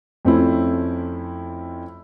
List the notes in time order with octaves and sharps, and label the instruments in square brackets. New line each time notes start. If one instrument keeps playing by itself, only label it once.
[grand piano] F2 A3 C4 C#4 E4